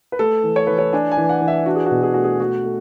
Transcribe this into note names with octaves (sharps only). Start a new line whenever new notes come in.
B4
A3 A4
E3
C#5
E3 B4
C#5
D4 G#5
G#5
E3
F#5
E3
E5
D4 F#4
G#4
F#4
B2
G#4
A3 F#4
G#4
A3 F#4
A3